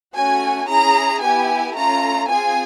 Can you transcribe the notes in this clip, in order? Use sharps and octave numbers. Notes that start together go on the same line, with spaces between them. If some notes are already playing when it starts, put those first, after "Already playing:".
A3 C#4 F#4 G#5
C#4 E4 G#4 A#5
B3 E4 G4 G#5
A3 C#4 F4 A#5
C4 F4 G#4 G#5